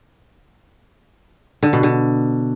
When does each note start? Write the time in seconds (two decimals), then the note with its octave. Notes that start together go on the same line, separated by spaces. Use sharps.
1.63 D3
1.73 B2
1.83 D3